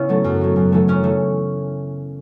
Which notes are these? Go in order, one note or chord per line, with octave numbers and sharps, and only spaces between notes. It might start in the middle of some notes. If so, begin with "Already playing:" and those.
Already playing: C#3 B3 C#4 E4
F#3 A3
F#2
F#3 A3
F#2
E3 A3
F#2 C#4
E3 A3